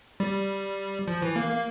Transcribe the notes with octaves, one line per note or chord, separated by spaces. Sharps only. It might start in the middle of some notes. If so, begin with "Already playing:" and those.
G3
F3
E3
A#3
A#3